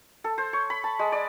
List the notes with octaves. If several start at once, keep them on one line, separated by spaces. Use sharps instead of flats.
A4
C5
C#5
B5
A5
G#3
D5